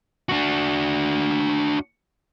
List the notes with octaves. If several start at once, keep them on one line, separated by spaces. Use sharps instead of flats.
D4 F#4